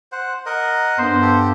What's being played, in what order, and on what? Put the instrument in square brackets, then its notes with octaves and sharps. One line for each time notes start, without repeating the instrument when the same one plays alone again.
[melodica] C5 F#5
A#4 D#5 F#5
[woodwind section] G2 B3 [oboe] C5
[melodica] G4 A4